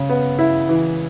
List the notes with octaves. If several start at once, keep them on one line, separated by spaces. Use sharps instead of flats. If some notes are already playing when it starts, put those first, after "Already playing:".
Already playing: C#3
B3
E4
E3